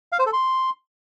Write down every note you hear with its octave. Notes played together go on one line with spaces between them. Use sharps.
F5
C5
A4
C6